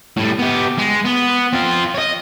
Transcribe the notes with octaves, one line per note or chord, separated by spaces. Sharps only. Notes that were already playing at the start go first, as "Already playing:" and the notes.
A2 G3
B3 G4
G#3
B3
C4 F4
C#5 D#5